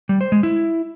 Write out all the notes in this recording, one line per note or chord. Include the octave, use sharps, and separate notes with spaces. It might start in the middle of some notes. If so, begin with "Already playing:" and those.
G3
C5
G#3
E4